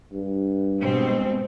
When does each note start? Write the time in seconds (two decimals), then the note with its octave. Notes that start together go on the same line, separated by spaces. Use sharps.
0.13 G2
0.80 G#2 B2 C4